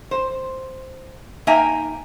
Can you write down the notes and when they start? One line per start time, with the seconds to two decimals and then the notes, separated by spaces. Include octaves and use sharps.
0.11 C5
1.47 A#3 D#4 E5 G5 G#5 A#5